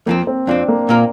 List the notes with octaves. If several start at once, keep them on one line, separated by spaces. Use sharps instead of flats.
F2 F3 A#3 C4
C4
F2 F3 C4 D4
A#3
A#2 A#3 F4 A#4